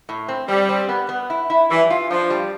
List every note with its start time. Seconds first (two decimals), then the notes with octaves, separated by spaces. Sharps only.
0.09 A2
0.29 C4
0.48 G3 C4
0.69 C4
0.89 B3
1.09 B3
1.30 E4
1.50 E4
1.70 E3 G3
1.90 F4
2.10 F3 D4
2.30 G3